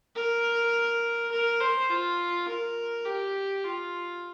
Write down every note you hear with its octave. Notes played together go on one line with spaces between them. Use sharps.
A#4
A#4
C5
F4
A#4
G4
F4